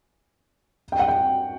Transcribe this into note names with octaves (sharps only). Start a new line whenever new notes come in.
G5
F#5
G5